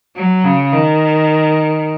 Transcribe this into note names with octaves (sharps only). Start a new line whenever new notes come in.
F#3
C#3
D#3